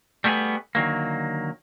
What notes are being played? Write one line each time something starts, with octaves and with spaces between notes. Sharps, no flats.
G3 A3 B3 E4 G#4
D3 D#3 F#3 A#3